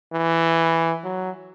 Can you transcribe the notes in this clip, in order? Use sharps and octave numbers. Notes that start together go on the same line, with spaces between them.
E3
F#3